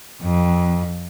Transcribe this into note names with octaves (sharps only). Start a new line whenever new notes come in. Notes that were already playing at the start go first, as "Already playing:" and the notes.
F2